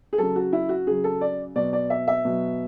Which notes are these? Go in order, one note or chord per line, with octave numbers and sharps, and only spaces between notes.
G#4
C#3 F#3 A4
F#4
E4
F#4
C#3 F#3 G#4
A4
D5
B2 F#3 D5
D5
E5
E5
B2 F#3